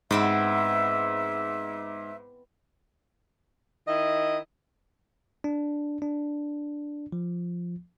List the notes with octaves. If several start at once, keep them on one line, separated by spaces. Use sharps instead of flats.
G#2 B3 C4 E4 E5
D#3 E4 D#5
D4
D4
F3